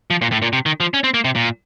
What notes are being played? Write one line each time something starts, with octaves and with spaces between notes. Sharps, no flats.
F3
A#2
A2
A#2
C3
D#3
F3
C#4
C4
A#3
C3
A#2